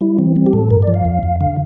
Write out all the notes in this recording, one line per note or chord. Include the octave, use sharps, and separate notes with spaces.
G3 E4
E3 C4
G3 C4
G4
A2 A4
G2 A#4
D5
F3
F5
F2
F2
D3 F5